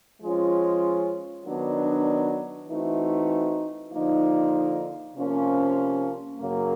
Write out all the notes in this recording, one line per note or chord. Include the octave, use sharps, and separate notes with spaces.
F3 G#3 C#4 F4
D#3 F#3 B3 D4
E3 A3 C4 D#4 F#4
D3 F3 A#3 D#4
C3 F3 A#3 C#4
F#2 C#3 F#3 A#3